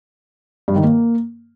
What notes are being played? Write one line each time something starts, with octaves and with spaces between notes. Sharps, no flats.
G2
D#3
A#3